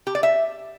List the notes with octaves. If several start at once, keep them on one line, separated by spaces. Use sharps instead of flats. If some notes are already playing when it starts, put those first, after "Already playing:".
G4
D5
E5